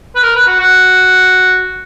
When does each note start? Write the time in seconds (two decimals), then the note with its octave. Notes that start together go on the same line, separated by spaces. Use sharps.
0.16 B4
0.23 A#4
0.36 B4
0.48 F#4
0.60 F#4